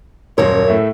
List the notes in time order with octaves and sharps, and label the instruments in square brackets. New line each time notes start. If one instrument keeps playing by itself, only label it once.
[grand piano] D#1 C6 [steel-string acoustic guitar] F#2 A#4 [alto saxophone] C#5
[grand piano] A2 A3 E5